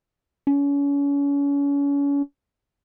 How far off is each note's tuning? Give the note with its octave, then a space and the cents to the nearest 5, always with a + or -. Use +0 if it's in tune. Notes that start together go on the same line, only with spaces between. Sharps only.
C#4 +35